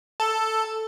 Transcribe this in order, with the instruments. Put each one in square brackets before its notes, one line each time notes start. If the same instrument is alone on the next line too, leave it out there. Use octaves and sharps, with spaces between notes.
[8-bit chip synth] A4